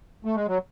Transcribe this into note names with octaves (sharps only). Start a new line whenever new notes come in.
A3
G#3
F#3